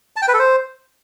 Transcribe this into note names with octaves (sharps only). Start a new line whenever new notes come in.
A5
G5
B4
A4
C5